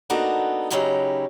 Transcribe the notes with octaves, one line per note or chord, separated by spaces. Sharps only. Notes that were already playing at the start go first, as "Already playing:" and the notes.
A#3 B3 D4 D#4 F#4 A4
C#3 F#3 C#4 D#4 E4 G4